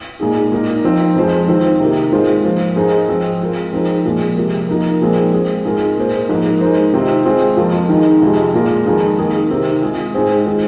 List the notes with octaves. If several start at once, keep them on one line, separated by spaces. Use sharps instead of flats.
A#2 G#3 D#4 G#4
A#2 A#3 D#4 A#4
F3 C4 D#4 C5
F2 F3 G#3 F4 C5
D#3 C4 F4 C5
C3 D#3 A#3
G#2 G#3 F4 C5
F3 A#3 F4 C5
G#2 G#3 D#4 C5
F3 C4 G#4 C5
G#3 F4 A#4
F3 C4 D#4 G#4 C5
A#2 F3 G#3
C3 F3 A#3 G#4
F3 A#3 D#4 A#4
A#2 F3 G#3 C4 D#4
G#3 C4 G#4
G#2 G#3 F4 A#4
A#2 A#3 G#4 C5
G#2 F3 A#3
G#3 D#4 C5
C3 D#3 C4 F4
G#3 C4 F4 C5
F2 F3 A#3 F4
D#3 G#3 D#4
F2 C3 G#3 F4
A#2 G#3 F4 A#4
F2 D#3 G#3 D#4 G#4
D#3 A#3 G#4
C3 D#3 C4
G#3 F4 G#4
G#2 G#3 C4 G#4 C5
D#3 G#3 F4 C5